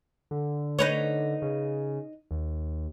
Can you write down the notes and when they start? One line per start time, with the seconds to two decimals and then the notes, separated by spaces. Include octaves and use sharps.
0.31 D3
0.79 D#4 B4 C#5
1.42 C#3
2.31 D#2